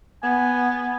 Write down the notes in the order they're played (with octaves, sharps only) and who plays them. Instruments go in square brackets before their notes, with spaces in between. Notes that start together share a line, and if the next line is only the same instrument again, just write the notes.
[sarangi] B3 [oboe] G#5